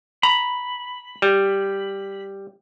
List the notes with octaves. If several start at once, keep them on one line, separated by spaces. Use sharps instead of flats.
A#5 B5
G3